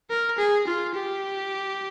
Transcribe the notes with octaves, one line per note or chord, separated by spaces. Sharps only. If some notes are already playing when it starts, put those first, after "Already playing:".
A#4
G#4
F4
G4